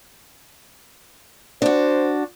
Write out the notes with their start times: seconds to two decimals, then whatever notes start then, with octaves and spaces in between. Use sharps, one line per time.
1.62 D4 F#4 C5